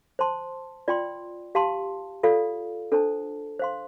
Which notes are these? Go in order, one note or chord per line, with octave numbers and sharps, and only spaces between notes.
C5 A5 C6
F4 D5 G5 C6
G4 F5 A5 C6
F4 A4 D5 F5
D4 A4 C5 A5
C5 F5 C6